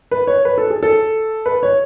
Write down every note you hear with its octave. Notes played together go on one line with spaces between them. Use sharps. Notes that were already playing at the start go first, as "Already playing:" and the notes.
B4
C#5
B4
A4
G#4
A4
B4
C#5